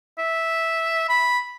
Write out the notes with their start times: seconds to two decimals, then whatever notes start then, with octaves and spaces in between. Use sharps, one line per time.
0.18 E5
1.09 B5